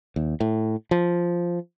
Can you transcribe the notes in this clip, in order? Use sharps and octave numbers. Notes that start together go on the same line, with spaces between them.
D#2
A2
F3